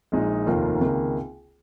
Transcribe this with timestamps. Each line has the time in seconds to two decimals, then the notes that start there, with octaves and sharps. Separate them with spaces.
0.12 A#1 A#2 G#3 D#4
0.46 F1 D#2 D#3 A#3 F4
0.81 C#2 C3 D#3 A#3